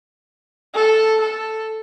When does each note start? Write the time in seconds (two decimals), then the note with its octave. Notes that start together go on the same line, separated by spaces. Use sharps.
0.75 A4
1.21 A4